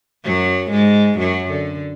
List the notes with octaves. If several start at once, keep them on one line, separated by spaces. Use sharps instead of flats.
F#2 F#3
G#2 G#3
F#2 F#3
D3